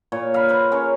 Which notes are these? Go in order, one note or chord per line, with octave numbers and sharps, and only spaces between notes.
A#2 C#5
F5 B5
B4 C5 F5
C#4 G#4 A#4 C#5